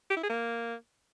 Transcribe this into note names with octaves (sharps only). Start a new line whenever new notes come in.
G4
E4
G#4
A#3